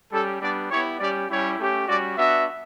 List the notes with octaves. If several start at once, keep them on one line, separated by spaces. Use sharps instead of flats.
G3 C#4 G4 A4
G3 B3 D4 D5
B3 E4 G4 C#5
G3 C#4 G4 D5
G3 C#4 E4 G4 C#5
A3 C#4 G4
G3 C#4 F#4 D5
B3 D4 F#4 E5